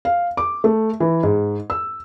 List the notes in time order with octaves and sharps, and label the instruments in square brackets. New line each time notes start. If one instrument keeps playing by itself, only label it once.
[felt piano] F5
D6
A3
E3
G#2
E6